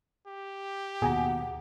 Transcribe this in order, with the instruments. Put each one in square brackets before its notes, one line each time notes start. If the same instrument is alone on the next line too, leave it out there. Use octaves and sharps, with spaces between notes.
[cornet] G4
[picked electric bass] D#2 B2 [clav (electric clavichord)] G#4 G#5 A#5 [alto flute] F#5